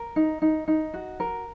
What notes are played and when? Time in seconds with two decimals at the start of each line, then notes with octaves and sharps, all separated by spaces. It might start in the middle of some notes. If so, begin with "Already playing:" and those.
Already playing: A#4
0.16 D#4
0.42 D#4
0.68 D#4
0.94 F#4
1.20 A#4